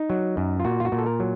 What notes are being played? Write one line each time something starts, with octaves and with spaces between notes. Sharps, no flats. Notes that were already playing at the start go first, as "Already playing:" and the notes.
Already playing: D#4
F#3
F#2
F4
A#2 F#4
F4
F#4
A#2
A4
A#4
F#3